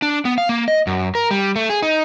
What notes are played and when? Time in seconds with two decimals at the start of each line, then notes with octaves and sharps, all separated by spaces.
0.02 D4
0.25 B3
0.38 F5
0.49 A#3
0.68 D#5
0.87 F#2
1.15 A#4
1.31 G3
1.56 A3
1.70 G#4
1.83 D#4